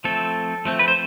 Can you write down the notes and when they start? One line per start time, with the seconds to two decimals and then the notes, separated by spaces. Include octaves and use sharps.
0.04 F3 A3 C4 A4
0.65 F3 A3 C4
0.79 B4
0.88 C5